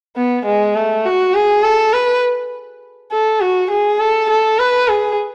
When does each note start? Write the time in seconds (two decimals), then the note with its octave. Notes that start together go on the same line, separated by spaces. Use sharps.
0.17 B3
0.46 G#3
0.76 A3
1.06 F#4
1.35 G#4
1.64 A4
1.93 B4
3.12 A4
3.41 F#4
3.71 G#4
4.00 A4
4.30 A4
4.59 B4
4.88 G#4